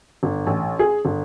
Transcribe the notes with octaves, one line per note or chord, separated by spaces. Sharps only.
G1
A1
G#4
G1